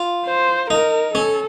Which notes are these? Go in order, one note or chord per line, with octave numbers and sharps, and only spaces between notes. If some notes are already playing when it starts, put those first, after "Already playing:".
Already playing: F4
C5
D#4 A#4
C#4 A4